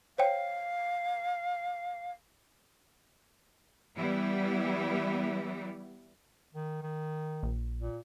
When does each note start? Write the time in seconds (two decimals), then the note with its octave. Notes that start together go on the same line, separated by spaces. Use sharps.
0.18 C5 C#5 F5 G5
3.96 E3 G3 B3 E4
6.55 D#3
6.83 D#3
7.43 A#1
7.81 A#2